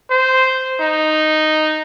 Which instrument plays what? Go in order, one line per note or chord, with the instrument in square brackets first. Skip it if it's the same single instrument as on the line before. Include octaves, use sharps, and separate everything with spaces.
[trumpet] C5
D#4